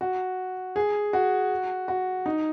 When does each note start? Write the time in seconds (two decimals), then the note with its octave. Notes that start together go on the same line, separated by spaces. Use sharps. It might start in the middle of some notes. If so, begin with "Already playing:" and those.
0.01 F#4
0.76 G#4
1.13 F#4
1.88 F#4
2.26 D#4